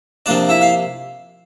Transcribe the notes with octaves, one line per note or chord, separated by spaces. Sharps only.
C3 F3 A#3 D4 D5
E4 E5
F5